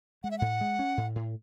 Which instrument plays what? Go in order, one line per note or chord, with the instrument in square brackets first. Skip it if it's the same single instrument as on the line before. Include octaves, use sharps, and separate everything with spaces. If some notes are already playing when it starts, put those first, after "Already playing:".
[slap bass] G#3 [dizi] F#5
[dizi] E5
[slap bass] A2 [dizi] F#5
[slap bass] G#3
C#4
A2
A2